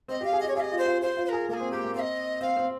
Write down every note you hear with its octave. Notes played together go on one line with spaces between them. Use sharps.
C4 D#5
G4
F5
G#4
G4 D#5
C#5
G#4 F5
D#5
F4
C5
F4
F4 C5
F4
C5
G#4 A#4
A#3 A#4
G#4
C4
A#3 G4
A#3
C4 D#5 F5
C4 F5
C4